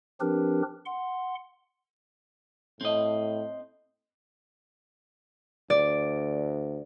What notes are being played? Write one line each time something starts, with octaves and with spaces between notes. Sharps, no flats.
F3 C4 D4 G4 A#4 B4
F#5 C6
A2 C4 D#5
D2 D5